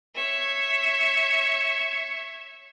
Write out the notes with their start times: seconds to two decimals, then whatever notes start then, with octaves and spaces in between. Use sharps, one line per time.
0.15 C#5 E5